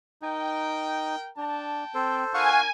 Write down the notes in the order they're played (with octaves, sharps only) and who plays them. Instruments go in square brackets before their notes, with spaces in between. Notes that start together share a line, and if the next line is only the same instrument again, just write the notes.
[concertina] D#4 [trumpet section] A#4 G5
[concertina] D4 [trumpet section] G5 A5
[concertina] C4 [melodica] A4 C5
[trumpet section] D4 F4 A#4 [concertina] F5 F#5 C#6 [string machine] G#5